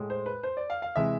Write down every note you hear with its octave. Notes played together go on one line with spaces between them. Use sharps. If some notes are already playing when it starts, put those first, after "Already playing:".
Already playing: A2 G#3
C5
B4
C5
D5
F5
F5
C3 E3 G#3 E5